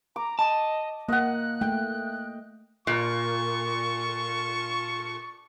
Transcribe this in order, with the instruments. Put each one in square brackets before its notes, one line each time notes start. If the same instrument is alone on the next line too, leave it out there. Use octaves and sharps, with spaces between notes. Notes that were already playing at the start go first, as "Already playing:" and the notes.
[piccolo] A#5 [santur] D6
[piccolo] D#5 [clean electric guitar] A5
[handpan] A#3 [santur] D#5 F#5 [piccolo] F#6
[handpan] A3 [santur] G5
[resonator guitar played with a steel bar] A#2 [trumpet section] F4 A5 C#6